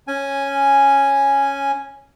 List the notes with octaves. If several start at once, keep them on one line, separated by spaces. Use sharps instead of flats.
C#4 G#5